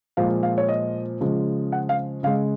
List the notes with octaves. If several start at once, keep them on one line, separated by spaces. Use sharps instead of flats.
A#2 F3 G#3 F5
F5
C#5
D#5
C#3 F3 G#3
F#5
F5
C#3 G#3 F5